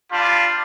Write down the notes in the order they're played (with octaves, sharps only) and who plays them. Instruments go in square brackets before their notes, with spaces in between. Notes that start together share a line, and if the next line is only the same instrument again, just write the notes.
[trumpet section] G3 D4 F4